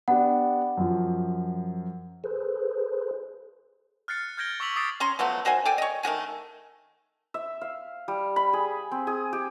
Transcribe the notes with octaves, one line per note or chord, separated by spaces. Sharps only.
B3 D4 G4 F#5
F#2 F3
G#4 A4 B4 C5
F6 F#6 A6 C7 C#7
F6 G6 G#6 A#6 D7 G7
C#6 D6 E6 B6 F7 F#7
D6 D#6 A6 A#6 C7 D7
C#4 C#5 A#5 C6
F3 F#3 A3 B3
D#3 F#4 C5 G#5
A4 D5 G5 G#5
C#5 D#5
D#3 A3 F#4 G#5
E5
F5
G3
B5
G#4
C4
G#4
G4